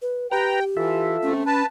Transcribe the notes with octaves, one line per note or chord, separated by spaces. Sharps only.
B4
G4 B4 G5 A#5
E3 F4 A4 E5
C3 A3 C#4
B4 A5